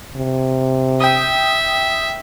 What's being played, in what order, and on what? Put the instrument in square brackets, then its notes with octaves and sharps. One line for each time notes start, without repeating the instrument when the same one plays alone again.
[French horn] C3
[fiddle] E5 [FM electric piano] G5 D#6